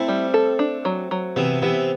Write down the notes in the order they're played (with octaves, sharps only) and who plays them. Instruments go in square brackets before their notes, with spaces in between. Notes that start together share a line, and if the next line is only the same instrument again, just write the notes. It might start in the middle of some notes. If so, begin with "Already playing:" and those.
Already playing: [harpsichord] A3 C4 [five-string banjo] E4
[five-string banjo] G3
A4
D4
F#3
F#3
[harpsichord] C3 E3 [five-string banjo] B3
[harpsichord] C3 E3 [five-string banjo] B3